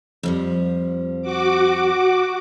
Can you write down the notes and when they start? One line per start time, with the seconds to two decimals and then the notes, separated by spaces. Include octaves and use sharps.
0.23 F2 F3 G3
1.22 F#4 D6